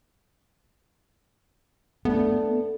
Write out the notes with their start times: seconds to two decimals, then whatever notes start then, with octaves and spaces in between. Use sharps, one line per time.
2.05 A3 B3 D4